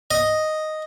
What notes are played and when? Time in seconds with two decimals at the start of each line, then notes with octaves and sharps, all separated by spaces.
0.11 D#5